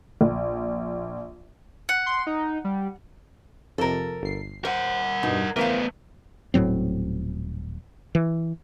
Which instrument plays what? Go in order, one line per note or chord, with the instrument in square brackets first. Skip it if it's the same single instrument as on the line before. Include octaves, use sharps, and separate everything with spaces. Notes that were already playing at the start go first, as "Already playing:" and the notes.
[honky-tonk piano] A#1
[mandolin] F#5
[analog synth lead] C6
D#4
G3
[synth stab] F2 C3 [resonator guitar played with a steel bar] A4 A#4
[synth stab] G1 C7
[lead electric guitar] A#4 F#5 [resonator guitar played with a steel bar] C5
[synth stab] G2 B2 [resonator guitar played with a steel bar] D#4
[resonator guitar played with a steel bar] E3 C5 F5 [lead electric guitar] A3 B3 [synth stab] A#4
[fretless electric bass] D#1 A2 F#3 C4
E3